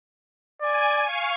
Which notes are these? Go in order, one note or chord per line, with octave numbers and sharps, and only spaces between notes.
D5 G#5
F5 C#6